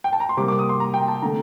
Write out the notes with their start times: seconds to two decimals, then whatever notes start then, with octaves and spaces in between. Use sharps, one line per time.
0.04 G5
0.13 A5
0.20 A#5
0.29 C6
0.37 C3 G3 A#3 D6
0.48 D6
0.59 D#6
0.69 C6
0.80 A#5
0.94 G5
1.08 A5
1.22 D3 A3 A#5